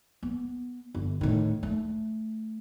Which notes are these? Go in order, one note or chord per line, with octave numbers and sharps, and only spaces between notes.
B3
G1
A2 D#3
A3